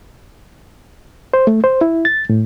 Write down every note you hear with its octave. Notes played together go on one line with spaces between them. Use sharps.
C5
A3
C5
E4
A6
A2